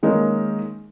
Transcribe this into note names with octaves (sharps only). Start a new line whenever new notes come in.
D#3 G#3 A#3 C#4 D#4